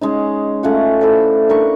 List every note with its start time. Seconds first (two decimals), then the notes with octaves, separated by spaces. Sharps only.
0.01 G#3 C#4 D#4
0.63 A3 C#4 F4 F#5
1.01 E4 A4 C5 D5
1.49 D4 A#4 D5 C#6